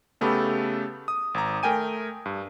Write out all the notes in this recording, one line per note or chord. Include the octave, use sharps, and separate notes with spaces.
C#3 A3 B3 G4 A4 B5
D#6
G#1 A#5
A3 A#4 G5 G#5 D#7
G2